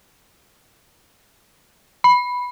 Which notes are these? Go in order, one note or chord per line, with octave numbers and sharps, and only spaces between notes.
B5